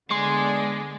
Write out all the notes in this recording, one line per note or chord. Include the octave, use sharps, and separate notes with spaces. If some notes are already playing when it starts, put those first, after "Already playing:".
D3 G#3 B3 D5 G#5 C6 C7